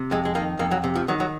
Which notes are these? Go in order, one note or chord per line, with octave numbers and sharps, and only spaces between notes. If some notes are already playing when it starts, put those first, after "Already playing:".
Already playing: C3
F2 G#3
G#3
D#3 A#3
F2 A#3
F#3
C3
F3
D#3 F#3
F#3